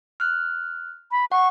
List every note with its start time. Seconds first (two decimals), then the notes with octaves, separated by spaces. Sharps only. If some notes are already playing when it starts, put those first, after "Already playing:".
0.20 F6 F#6
1.11 B5
1.32 F#5 C#6